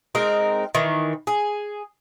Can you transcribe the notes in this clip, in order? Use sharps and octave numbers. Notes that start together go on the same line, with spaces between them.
G#3 C4 D#4 A#4
D#3 E3
G#4